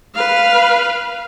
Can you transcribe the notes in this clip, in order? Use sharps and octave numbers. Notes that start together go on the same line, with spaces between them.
B4 F5